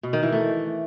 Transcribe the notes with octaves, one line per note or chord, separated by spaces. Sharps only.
B2
D#3
E3
A3